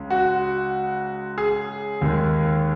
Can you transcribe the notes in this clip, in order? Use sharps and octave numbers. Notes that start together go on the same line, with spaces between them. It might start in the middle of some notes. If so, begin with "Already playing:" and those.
Already playing: C#2 C#3 G#3
F#4
G#4
D#2 D#3 G#3